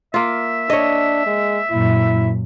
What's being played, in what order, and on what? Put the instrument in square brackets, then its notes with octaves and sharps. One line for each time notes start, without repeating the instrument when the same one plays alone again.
[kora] A#3 F4 [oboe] E5
[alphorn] D4 [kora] C#5 D#5
[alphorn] G#3
[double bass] F#2 A#2 [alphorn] E4